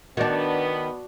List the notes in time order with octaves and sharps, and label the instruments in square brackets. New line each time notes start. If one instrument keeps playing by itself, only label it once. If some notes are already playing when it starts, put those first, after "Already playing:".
[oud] D#3 D4 [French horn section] B3 [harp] F#4 D5 A5